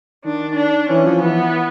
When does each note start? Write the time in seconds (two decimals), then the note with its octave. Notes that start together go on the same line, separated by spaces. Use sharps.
0.25 D#3 D4
0.57 D4
0.90 E3 C#4
1.06 F3
1.22 E3 B3